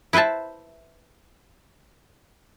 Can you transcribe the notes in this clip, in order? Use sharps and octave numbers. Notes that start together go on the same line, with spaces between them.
E4 B4 C5 E5 A5